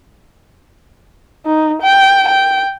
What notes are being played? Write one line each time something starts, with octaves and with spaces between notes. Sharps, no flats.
D#4
G5
G5